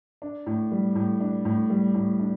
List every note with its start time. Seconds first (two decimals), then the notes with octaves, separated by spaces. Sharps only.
0.22 D4
0.46 A2
0.72 G3
0.95 A2
1.21 D4
1.45 A2
1.70 G3
1.94 A2
2.20 D4